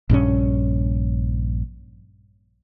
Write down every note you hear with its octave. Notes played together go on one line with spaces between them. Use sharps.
A#1 G2 F3 C#4